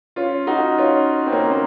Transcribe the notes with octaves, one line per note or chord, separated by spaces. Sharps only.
C#4 F4
D#4 F#4
C#4 F4
C4
A#3 C#4
A#3